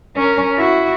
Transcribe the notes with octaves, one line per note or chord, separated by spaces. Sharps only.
C#4 A#4
E4 F#4